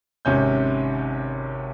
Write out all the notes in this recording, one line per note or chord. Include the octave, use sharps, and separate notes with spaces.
G#1 C3 C#4 G6